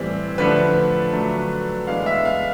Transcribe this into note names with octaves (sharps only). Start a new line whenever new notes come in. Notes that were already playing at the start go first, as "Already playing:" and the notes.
Already playing: A2 E3 G3 C4
D3 F3 A3 D4 B4
D3 F#3 A3 D4
E3 G#3 B3 D4 F5
E5
F5